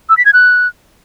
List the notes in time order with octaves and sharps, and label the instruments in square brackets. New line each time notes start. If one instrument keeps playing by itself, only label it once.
[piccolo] E6
B6
G#6
F#6